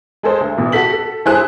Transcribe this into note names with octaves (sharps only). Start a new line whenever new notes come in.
G#3 G#4 A4 C5
D2
A1 B2
F#4 G4 A4 B6 F#7
A4
G2 E4 G#4 C5 G#5 F#6